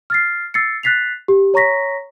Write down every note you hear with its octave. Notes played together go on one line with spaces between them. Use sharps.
F6 A6 C7
E6 A6 C7 C#7
F#6 A6 B6 C7 F7
G4
C#5 A#5 C#6 A#6 B6